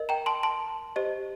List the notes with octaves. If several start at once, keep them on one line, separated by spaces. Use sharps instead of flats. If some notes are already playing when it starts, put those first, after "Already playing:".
Already playing: A#4 D#5
G5 A#5
A5 C6
A5 C6
G4 C5 D#5